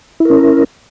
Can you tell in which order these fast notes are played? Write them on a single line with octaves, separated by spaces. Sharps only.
E4 A#4 C#4